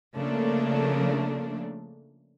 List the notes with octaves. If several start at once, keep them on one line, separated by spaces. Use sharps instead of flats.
C#3 F3 A3 A#3 D4